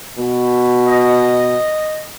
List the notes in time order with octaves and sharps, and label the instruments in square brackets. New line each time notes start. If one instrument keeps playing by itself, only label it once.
[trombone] B2
[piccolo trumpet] D#5